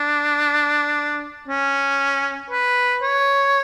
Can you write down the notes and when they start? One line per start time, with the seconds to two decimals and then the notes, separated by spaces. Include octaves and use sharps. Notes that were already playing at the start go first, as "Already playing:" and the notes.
Already playing: D4
1.48 C#4
2.50 B4
3.02 C#5